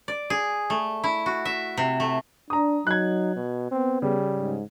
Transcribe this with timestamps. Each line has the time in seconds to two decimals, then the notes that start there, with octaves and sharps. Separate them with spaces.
0.08 D5
0.30 G#4
0.70 A3
1.04 E4
1.26 F#4
1.45 E5
1.77 C3
2.00 A3
2.50 D4 A#5 D#6
2.87 F#3 D#4 F#6 G#6
3.36 B2
3.71 B3 C4
4.02 C#3 G3
4.36 G#2